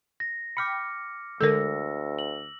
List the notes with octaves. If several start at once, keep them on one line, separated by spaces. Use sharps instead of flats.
A#6
G5 B5 D6 F6 C#7
D2 D3 G#3 A4 A#4 E6 A#6
F#7